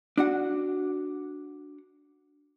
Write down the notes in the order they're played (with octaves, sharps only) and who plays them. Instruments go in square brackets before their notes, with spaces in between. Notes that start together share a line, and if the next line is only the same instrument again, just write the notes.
[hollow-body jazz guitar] D4 F#4 F#5